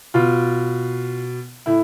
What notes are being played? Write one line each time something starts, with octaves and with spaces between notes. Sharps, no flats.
B2 F4
A2 E4